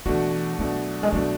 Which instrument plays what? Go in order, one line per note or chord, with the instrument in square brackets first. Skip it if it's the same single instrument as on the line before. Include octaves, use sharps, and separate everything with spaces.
[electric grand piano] B2 A3 D4 F#4 [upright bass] E3
[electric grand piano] B2 A3 D4 F#4 [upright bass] F#3
[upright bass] G#3
[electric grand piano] B2 A3 D4 F#4 [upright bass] F#3